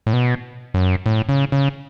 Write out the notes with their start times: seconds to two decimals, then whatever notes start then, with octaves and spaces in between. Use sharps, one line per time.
0.07 A2
0.13 B2
0.74 F#2
1.06 A2
1.29 C#3
1.52 C#3